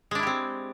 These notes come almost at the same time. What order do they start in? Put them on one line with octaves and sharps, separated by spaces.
G#3 D4 E4 G4 C4